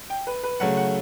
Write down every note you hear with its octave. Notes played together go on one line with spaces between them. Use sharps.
G5
B4
B4
C#3 F#3 A3 F#5
F#5